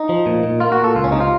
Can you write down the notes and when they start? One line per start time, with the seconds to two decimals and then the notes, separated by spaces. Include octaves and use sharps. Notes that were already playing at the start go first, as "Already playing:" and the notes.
Already playing: D#4
0.09 F3
0.26 A#2
0.43 A#2
0.60 A#3 F4
0.72 F#4
0.78 A#2
0.84 A4
0.95 C#2 F4
1.04 C#4
1.12 C3 D#4
1.21 F4